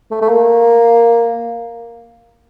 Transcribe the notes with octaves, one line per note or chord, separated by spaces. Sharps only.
A3
A3
A#3